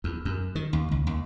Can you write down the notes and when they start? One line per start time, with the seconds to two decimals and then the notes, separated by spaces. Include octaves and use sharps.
0.04 E2
0.25 F#2
0.55 D#3
0.73 D#2
0.92 C#2
1.07 D#2